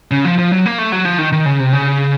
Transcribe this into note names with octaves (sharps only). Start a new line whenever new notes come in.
C#3
F3
F3
F#3
A#3
A3
F#3
F3
D#3
D#3
C#3
C3
C#3